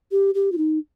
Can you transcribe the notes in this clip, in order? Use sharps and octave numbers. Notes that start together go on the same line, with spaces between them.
G4
G4
F4
D#4